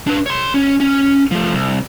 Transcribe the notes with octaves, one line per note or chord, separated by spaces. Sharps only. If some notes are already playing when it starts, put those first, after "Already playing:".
D4 B4
C#5 C6
C#4
C#4
F3 A3
C2